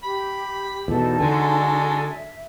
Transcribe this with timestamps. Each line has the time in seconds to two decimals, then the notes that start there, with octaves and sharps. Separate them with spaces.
0.03 G4 B5
0.88 E2 B2 D#4 A4
1.20 D3 F#3 G#3 G#5
2.09 E5